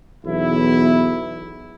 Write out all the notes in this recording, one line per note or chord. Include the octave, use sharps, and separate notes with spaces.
B1 E2 E4